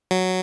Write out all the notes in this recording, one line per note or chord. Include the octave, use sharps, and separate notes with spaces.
F#3